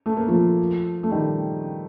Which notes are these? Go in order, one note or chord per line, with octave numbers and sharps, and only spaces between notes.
A3
A#3
F3 A3
A3
D#3 G3